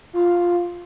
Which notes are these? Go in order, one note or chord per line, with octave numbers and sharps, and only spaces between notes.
F4